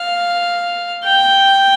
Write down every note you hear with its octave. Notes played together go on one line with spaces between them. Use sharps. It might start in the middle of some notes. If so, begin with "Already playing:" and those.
Already playing: F5
G5